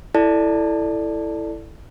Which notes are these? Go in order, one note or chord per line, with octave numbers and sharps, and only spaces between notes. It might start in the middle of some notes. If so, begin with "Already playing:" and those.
E4 A4 D5 A5